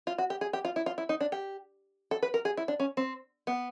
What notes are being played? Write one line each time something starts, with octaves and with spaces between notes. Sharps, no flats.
F4
F#4
G4
G#4
G4
F4
E4
F4
E4
D#4
D4
G4
A4
B4
A#4
G#4
E4
D4
C#4
C4
B3